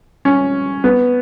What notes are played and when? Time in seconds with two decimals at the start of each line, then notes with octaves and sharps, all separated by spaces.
0.25 C#4
0.84 B3